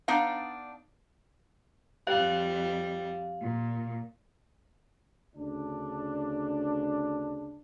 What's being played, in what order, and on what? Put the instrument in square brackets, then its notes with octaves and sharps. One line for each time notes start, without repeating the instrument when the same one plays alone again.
[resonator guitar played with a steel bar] B3 D4 D#4 D5 F5
[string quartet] F2 G3 [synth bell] F5
[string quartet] A#2
[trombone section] D2 C#3 D4